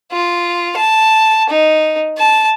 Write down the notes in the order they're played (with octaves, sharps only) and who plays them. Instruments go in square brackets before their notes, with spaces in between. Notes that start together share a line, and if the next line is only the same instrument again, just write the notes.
[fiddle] F4
A5
D#4
A5